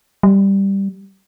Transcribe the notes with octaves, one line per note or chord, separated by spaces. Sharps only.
G3